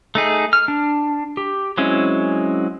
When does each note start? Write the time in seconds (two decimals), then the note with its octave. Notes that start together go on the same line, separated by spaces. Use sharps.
0.15 A3 D#4 G#4
0.53 F6
0.68 D4
1.37 G4
1.78 F#3 G#3 C4 C#4 E4